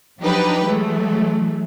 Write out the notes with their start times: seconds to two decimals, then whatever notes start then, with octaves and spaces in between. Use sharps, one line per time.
0.21 F3 F#3 D4 D#4 G4 B4
0.64 E3 F#3 G#3 A3